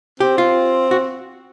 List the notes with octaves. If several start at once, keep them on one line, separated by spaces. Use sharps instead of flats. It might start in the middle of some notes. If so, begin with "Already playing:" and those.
C4 G4
F4
F#4